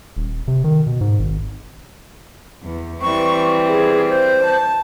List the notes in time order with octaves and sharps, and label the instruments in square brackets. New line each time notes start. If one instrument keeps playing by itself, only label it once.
[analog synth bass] D#1
C3
D#3
B2
G#2
G#1
[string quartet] E2
[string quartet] E3 G3 C4 [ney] C#6
[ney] G#4
C5
[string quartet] A5